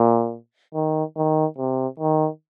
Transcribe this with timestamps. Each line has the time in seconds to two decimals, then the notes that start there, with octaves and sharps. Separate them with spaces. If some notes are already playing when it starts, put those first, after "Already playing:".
Already playing: A#2
0.74 D#3
1.16 D#3
1.58 C3
1.99 D#3